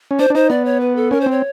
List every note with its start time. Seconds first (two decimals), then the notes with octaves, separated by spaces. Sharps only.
0.11 C#4
0.19 D4 C5
0.30 D4
0.35 D#4 C5
0.50 B3 D5
0.65 C#5
0.80 B4
0.96 A4
1.11 C#4 A#4
1.21 C5
1.26 C4
1.31 C#5